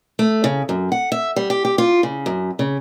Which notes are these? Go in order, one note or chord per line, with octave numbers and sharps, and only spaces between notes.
A3
C#3
F#2
F#5
E5
G3
G4
G4
F4
C#3
F#2
C#3